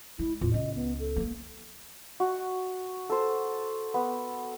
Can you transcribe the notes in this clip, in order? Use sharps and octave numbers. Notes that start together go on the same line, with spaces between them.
G#3 E4
E2 A2 F4
C#2 D#5
B3
A4
G#3 A#3
F#4
A4 C5
B3